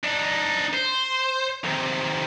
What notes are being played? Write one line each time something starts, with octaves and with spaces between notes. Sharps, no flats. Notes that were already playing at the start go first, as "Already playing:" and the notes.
D4 D#4
C5
C3 D#3